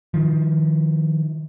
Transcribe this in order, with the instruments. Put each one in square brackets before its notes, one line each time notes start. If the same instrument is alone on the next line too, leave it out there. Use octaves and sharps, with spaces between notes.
[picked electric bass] D#3 F3